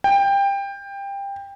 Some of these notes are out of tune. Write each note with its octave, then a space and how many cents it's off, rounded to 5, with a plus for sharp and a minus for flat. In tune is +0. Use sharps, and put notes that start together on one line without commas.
G5 +20